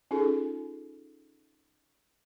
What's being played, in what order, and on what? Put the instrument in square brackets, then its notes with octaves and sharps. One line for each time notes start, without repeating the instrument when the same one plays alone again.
[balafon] C#4 D#4 F4 G#4 A4